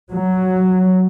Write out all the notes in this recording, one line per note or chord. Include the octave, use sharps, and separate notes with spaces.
F#3